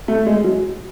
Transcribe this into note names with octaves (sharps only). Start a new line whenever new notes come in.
A3
G#3
F#3